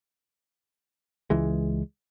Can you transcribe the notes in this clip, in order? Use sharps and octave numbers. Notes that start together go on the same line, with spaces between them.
C#2 E3 G#3